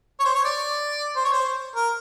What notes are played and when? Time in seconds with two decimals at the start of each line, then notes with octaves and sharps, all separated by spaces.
0.20 C#5
0.25 C5
0.35 C#5
0.45 D5
1.16 C5
1.25 C#5
1.33 C5
1.76 A#4